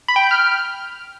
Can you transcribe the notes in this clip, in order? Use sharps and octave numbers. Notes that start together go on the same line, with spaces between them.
B5
G5
G6
F6